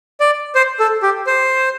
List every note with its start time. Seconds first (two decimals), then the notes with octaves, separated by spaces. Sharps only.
0.20 D5
0.55 C5
0.80 A4
1.03 G4
1.27 C5